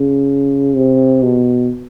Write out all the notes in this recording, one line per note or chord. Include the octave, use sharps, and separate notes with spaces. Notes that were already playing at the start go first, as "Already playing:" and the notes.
Already playing: C#3
C3
B2